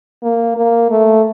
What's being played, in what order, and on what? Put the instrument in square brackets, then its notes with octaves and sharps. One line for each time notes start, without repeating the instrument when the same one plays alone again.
[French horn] A#3
A#3
A3